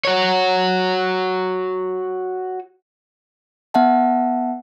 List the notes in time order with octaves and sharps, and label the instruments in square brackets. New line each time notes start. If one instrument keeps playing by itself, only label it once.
[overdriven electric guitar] F#4 C#5
[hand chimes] B3 E5 F#5 A5